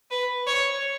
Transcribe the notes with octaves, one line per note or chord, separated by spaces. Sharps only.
B4
C#5